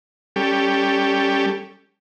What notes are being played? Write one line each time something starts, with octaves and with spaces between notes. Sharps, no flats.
G3 C#4 G4 A4